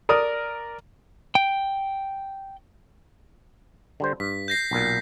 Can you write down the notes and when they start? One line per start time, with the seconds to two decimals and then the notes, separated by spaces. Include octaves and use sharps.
0.09 A#4 D5 D#6
1.35 G5
4.00 D3 G3 C5
4.20 G2 B6
4.48 G6 A#6 C7
4.71 B1 A#2